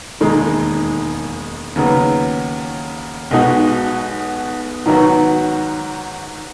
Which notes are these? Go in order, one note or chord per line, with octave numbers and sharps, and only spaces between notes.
E1 D#2 D#3 G#3
D#2 C#3 F#3 B3
B1 B2 G#3 D#4 F#4
G#2 D#3 F#3 B3 F#4